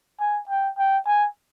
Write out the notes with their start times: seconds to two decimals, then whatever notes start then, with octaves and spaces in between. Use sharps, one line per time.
0.20 G#5
0.49 G5
0.78 G5
1.07 G#5